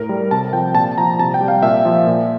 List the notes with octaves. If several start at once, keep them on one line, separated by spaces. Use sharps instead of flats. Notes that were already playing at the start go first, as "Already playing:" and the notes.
Already playing: A2 A#4
G3
C3 A5
F3 G5
A#2 A5
F3 A#5
C3 A5
G5
G3
F5
A#2 E5
F3
A#2